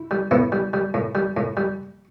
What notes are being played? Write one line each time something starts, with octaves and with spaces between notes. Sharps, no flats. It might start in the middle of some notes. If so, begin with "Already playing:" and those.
Already playing: E4
G3
A2 B3 E4
G3
G3
A2
G3
A2
G3